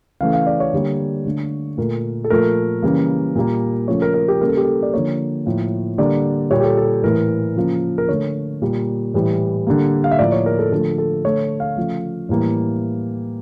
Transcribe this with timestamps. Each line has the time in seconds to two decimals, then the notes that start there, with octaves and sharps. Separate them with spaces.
0.21 C#3 E3 A3 F5
0.33 F5
0.47 D5
0.60 C#5
0.73 D3 G3 A#3
1.25 D3 A3
1.78 A#2 A3 A#4
2.24 A4
2.30 A#2 F3 A3 A#4
2.83 C#3 E3 G3 A#3
3.35 A#2 G3 A#3
3.88 C#3 F3 A3 C#5
4.02 A#4
4.14 A#4
4.28 G4
4.41 C#3 G3 A#3 A#4
4.48 A4
4.57 G4
4.65 A4
4.82 D5
4.94 D3 F3 A#3 C#5
5.46 A2 F3 A#3
5.98 D3 G3 A#3 D5
6.51 A#2 G3 A#3 C#5
6.60 G4
6.65 A4
6.77 A4
7.03 A2 E3 A3 A#4
7.56 C#3 F3 A#3
7.98 A#4
8.09 D3 A3 C#5
8.62 A#2 G3 A#3
9.14 A2 E3 G3
9.67 D3 G3 A#3
10.04 F5
10.11 E5
10.19 A2 F3 A#3 D5
10.32 C#5
10.46 A#4
10.59 A4
10.72 D3 F3 A3 A4
10.98 A4
11.24 D3 A3 C#5
11.60 F5
11.77 C#3 F3 A3
12.29 A2 E3 G3 A#3